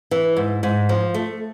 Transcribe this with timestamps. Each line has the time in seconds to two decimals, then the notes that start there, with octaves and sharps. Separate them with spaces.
0.11 E3
0.37 G#2
0.63 G#2
0.89 F3
1.14 A3